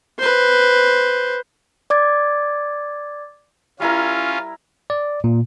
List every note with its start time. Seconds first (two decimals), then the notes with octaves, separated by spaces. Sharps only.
0.18 B4 C5
1.90 D5 D6 G#6 A6
3.80 G3 C#4 E4 F4 A#4
4.90 D5
5.24 A#2